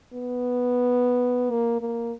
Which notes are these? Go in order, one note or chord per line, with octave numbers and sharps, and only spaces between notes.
B3
A#3
A#3